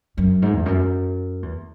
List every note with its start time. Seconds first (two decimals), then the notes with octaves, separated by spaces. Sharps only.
0.18 F#2
0.42 G#2
0.54 E2
0.66 F#2
1.43 E2